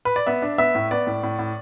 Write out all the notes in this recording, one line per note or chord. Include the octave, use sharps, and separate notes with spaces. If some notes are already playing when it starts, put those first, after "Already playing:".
B4
D5
B3 E5
D4
B3 E5
A2
B3 D5
A2
A2
A2